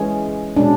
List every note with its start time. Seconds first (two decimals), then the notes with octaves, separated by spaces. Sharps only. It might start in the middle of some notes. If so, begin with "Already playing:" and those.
Already playing: E3 G#3 C#4 G#4
0.56 B2 G#3 C#4 D4